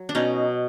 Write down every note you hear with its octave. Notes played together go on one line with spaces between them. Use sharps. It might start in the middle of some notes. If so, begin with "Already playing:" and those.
Already playing: F#3
D4
B2 C#4 D#4